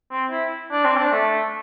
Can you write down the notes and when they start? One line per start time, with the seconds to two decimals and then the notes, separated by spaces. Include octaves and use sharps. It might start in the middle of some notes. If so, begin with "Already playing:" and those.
0.11 C4
0.31 E4
0.72 D4
0.84 C4
0.97 D4
1.12 A3